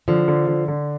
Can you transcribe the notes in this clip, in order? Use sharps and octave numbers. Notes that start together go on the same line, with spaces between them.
D3 F3
D3
D3
D3